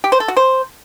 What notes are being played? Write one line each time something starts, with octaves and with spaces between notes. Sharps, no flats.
G4
C5
A4
F#4
C5